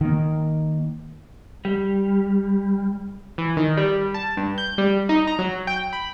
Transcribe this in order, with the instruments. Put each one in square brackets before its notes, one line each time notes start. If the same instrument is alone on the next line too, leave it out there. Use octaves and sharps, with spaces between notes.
[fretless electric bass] D#3 A#3
[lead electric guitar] G3
[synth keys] E3
D#3
G3
A5
G2
G6
G3
D#4
A#5
F#3
G5
B5